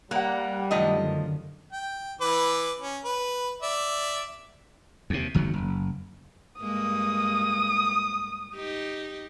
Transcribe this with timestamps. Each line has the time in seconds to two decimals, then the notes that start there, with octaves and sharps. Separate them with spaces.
0.11 G3 A#3 F#5 A#5 F#6
0.71 F#2 D3 D#3 F3 A3 D#5
1.72 G5
2.21 E3 B4 D6
2.79 C#4
3.05 B4
3.63 D5 E5
5.10 D#2 C3
5.34 G1 E2 D#3 F#3
5.54 F#1
6.61 G2 G#3 A#3 D#6
8.56 D#4 G4